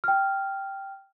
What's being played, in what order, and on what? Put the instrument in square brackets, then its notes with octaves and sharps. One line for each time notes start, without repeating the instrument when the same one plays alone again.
[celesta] G5 F6